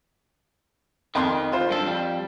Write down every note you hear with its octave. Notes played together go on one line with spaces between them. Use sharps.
F2 D#3 C6
F4 C5
G2 A4
F2 G3